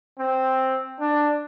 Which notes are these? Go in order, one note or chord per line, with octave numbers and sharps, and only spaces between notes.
C4
D4